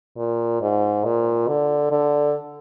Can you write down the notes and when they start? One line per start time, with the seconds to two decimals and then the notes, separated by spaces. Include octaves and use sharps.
0.17 A#2
0.61 G#2
1.05 A#2
1.48 D3
1.91 D3